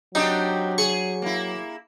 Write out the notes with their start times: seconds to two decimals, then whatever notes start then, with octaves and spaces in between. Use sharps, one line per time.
0.15 F#3 C4 D4 D#4 G4
0.78 G#4 C#6
1.22 A#3 E4